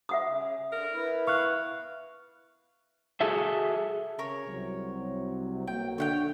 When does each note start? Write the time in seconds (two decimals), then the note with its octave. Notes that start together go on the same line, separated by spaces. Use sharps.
0.09 E5 F#5 D#6
0.26 C#3
0.72 D3 A#4
0.92 B3 E4
1.27 F5 C#6 F#6
3.21 F#4 G#4 A4 E5
4.19 C#3 A#4 C#5
4.48 C2 C3 F#3
5.68 B1 F#3 A#3 G5
5.98 D3 C#5 F#5 G5